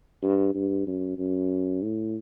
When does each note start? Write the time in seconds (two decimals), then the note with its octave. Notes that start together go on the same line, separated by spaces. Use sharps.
0.23 G2
0.54 G2
0.87 F#2
1.18 F#2
1.82 A2